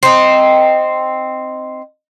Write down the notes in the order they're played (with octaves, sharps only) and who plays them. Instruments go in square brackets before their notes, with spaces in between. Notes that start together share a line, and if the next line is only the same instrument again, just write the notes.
[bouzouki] C4 D#4